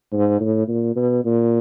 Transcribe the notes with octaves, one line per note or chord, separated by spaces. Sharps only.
G#2
A2
A#2
B2
A#2